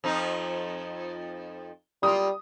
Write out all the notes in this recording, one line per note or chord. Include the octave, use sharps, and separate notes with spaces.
F2 F3 D#4
G3 A#3 F4 D#6